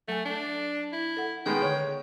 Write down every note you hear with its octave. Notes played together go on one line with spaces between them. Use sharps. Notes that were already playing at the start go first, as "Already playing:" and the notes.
F#3 A3 G#5
D4
E4
A4 F#5
D#3 G#3 B3 G5
D3 C#5